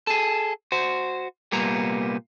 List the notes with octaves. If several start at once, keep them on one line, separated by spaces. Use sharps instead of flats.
G#4 A4
F#4 C5
C2 A#2 G3 A#3 B3 A#5